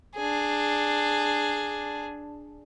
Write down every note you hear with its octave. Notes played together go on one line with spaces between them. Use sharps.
D4 G#4